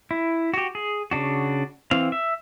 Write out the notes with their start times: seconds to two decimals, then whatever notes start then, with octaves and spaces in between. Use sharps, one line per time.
0.11 E4
0.54 F#4 G4
0.75 G#4
1.11 C#3 D4 F#4
1.91 E3 C4 F5
2.12 E5